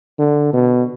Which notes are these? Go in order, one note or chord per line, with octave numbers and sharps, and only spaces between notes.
D3
B2